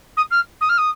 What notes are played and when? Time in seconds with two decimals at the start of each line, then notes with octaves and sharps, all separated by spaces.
0.17 D#6
0.31 F6
0.61 D#6
0.69 F6
0.78 D#6